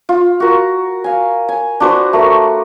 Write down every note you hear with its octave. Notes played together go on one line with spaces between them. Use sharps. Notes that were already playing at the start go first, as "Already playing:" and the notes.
F4
F#4 A#4
F5 G#5
G#5
D4 F#4 B4 C5
A3 A#4